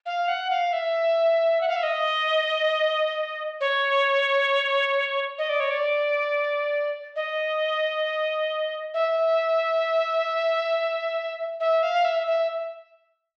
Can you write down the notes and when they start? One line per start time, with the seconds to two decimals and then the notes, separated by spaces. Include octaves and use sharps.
0.06 F5
0.28 F#5
0.50 F5
0.73 E5
1.61 F#5
1.68 F5
1.76 E5
1.83 D#5
3.61 C#5
5.38 D#5
5.49 D5
5.60 C#5
5.70 D5
7.16 D#5
8.94 E5
11.60 E5
11.83 F5
12.05 E5
12.27 E5